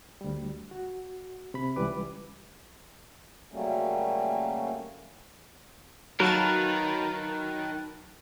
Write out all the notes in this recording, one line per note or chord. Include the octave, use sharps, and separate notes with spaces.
D2 G3
F#4
C3 B5
C#2 E3 G3 B4 D6
C#3 F#3 G3 A3 A#3 C#4
D#3 F#3 A#4 B4 F5 A5 A6